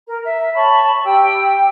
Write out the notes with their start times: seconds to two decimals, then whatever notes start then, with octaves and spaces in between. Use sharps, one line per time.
0.07 A#4
0.25 E5
0.55 C#5 A5 B5 C#6
1.04 G4 G5 E6